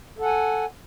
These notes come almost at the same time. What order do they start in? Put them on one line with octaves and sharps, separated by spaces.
A4 F#5 G#5